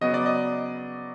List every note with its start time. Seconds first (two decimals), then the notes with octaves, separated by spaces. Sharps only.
0.01 C#3 F#3 B3 D#5
0.14 D5
0.26 D#5